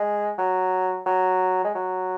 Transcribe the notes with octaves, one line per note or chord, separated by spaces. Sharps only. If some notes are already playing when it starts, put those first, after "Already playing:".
Already playing: G#3
F#3
F#3
G#3
F#3